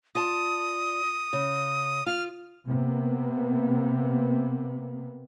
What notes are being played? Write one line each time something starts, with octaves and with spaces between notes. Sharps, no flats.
F4 D5 A5 D#6
C#3
F4 F6
C3 A#3 B3